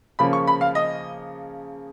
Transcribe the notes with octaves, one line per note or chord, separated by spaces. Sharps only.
C#3 F3 A#3 C#4 B5
C#6
B5
F5
D#5